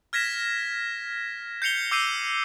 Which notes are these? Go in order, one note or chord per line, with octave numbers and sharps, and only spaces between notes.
F6 G#6 A#6 B6 E7
G6 C7 C#7 F7 G7
D6 E6 G6 C7 D#7